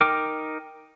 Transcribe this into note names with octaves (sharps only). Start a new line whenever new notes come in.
D#4 A#4 G5 D6